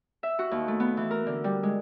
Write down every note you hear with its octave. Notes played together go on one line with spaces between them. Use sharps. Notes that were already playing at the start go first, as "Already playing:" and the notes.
E5
F#4
D#2
A3
B3
E3
A#4
D3
G3
G#3